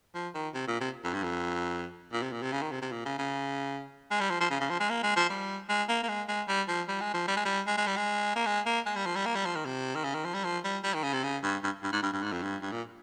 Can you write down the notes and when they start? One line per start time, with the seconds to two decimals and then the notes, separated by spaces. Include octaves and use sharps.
0.14 F3
0.34 D#3
0.54 C3
0.67 A#2
0.80 C3
1.04 F2
1.14 G2
1.23 F2
2.12 A#2
2.22 C3
2.32 A#2
2.42 C3
2.52 C#3
2.62 D#3
2.71 C3
2.82 C3
2.92 A#2
3.05 C#3
3.18 C#3
4.11 G#3
4.20 G3
4.30 F3
4.40 F3
4.50 C#3
4.60 C#3
4.70 F3
4.80 G#3
4.90 A#3
5.03 G#3
5.16 F3
5.29 G3
5.69 G#3
5.89 A#3
6.03 A#3
6.08 G#3
6.28 G#3
6.48 G3
6.68 F3
6.88 G3
7.01 G#3
7.14 F3
7.28 G3
7.36 G#3
7.45 G3
7.66 G#3
7.77 G#3
7.87 G3
7.97 G#3
8.35 A#3
8.46 G#3
8.66 A#3
8.86 G#3
8.96 G3
9.05 F3
9.16 G3
9.26 A#3
9.35 G3
9.45 F3
9.55 D#3
9.65 C3
9.95 D#3
10.04 C#3
10.14 D#3
10.24 F3
10.34 G3
10.44 F3
10.64 G3
10.84 G3
10.94 D#3
11.03 C#3
11.13 C3
11.23 C#3
11.43 G2
11.63 G2
11.83 G2
11.92 G#2
12.02 G2
12.12 G2
12.23 G#2
12.32 F2
12.42 G2
12.62 G2
12.72 A#2